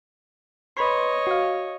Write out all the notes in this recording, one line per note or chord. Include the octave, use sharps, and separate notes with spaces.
B4 C#5 D#5 B5 C6
F#4 F5